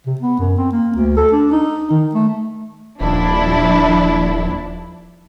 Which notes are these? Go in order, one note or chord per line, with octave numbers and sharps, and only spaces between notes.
C3
B3
F#2
C4
A#3
D2
A4
D4
D#4
D#3
A3
D#1 F3 D4 E4